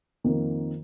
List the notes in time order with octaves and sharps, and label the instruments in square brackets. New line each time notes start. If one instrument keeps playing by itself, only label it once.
[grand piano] F2 D#3 A#3